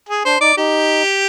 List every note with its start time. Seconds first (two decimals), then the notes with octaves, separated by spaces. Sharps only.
0.09 G#4
0.25 D4 C5
0.41 D#4 D5
0.57 D#4 G4